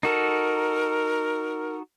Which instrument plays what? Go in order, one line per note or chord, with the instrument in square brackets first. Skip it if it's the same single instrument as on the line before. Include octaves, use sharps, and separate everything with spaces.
[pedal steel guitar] D#4 F#4 A4 [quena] A#4